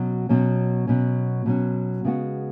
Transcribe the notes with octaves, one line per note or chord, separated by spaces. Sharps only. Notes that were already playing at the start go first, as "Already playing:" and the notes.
Already playing: B2 F#3 C#4
B2 F#3 C#4
B2 F#3 C#4
B2 F#3 C#4
C#3 G#3 B3 F#4